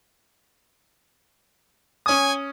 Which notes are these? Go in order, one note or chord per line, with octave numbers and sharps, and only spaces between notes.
C#4 C#5 G#5 D#6